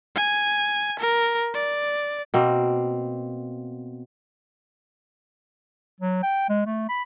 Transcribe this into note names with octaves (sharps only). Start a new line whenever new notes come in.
G#5
A#4
D5
B2 A#3 C4
F#3
G5
G#3
A3
B5